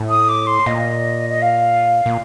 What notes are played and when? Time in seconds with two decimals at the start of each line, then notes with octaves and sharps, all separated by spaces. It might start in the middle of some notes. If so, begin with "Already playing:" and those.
Already playing: A2
0.09 D#6
0.29 D6
0.47 C6
0.66 A#2 D#5
1.30 D#5
1.42 F5
2.06 A#2